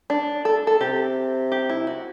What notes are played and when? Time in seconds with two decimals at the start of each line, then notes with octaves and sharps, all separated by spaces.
0.10 D4
0.45 A4
0.67 A4
0.81 C3 G4
1.52 G4
1.69 E4
1.87 F#4